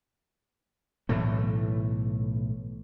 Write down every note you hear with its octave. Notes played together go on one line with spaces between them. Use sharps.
B1 A2 E3 A3